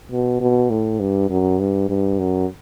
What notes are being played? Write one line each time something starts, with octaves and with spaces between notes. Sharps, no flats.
B2
B2
A2
G2
F#2
G2
G2
F#2